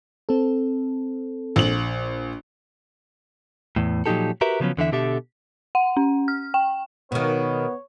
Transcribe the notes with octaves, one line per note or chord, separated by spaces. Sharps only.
C4 A4
A#1 F#7
E2 A2
A#2 F3 F#3 D#4 G4 A4
F#4 G4 A#4 B4 E5
C#3 F3 F#3 B3 C#4
E2 D3 E3 E5
B2 D3 G4 A4 E5
F#5
C#4
F6
G5
B2 D#3 B3 C#5